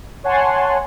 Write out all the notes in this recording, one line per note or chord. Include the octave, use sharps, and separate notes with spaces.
C#5 F#5 G#5 A5 C6